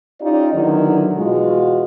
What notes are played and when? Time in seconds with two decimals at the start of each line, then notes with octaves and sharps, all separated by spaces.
0.21 C#4 D#4 F4 G4 D5 D#5
0.53 D3 D#3 F#3 B3 E4 F#4
1.15 B2 E3 G#3 F4 F#4